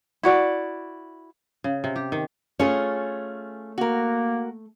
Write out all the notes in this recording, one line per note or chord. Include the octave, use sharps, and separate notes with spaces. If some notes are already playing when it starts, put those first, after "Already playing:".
E4 F#4 D5
C#3
C3
G4
D#3
A3 C#4 F4 G#4 C#5
A#3 F#4 A#4